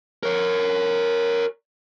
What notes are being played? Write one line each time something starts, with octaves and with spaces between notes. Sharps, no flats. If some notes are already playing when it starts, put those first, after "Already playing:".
A#4 C#5